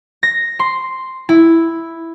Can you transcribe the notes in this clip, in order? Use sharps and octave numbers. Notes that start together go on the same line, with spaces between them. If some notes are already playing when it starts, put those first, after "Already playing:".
A#6
C6
E4